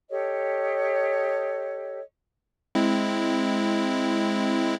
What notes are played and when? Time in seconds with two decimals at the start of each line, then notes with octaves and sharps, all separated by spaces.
0.10 G4 A4 C#5 D#5
2.75 G#3 C4 E4